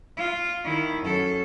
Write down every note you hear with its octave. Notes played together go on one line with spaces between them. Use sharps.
F4
D#3 E4
F#2 A4